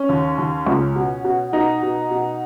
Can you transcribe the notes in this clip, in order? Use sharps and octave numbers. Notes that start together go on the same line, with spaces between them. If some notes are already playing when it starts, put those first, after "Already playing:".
Already playing: C#4
D#2
D#2
C#2
B2
B2
B2 D#4
B2
B2